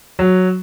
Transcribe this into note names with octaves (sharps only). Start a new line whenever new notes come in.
F#3